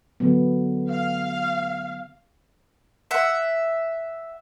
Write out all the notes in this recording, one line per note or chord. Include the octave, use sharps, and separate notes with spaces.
D3 F#3 B3
F5
E5 F#5